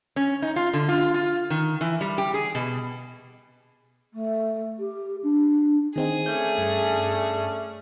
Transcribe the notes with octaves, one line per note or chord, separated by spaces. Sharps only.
C#4
D#4
F4
D3
F4
F4
D#3
E3
G3
G4
G#4
B2
A3
G4
D4
D#3 C4 D#4 G#4
A3 C#4 D4 G6
G2